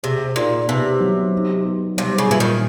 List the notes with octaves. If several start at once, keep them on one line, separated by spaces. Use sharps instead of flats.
C3 G#4
A#2 D#4
C3 B3
F#3
D#4
B3
C3 G3
C#3
A#2 E3
D#3